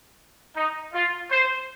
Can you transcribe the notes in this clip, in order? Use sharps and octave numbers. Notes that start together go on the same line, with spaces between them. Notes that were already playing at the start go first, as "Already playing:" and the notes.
D#4
F4
C5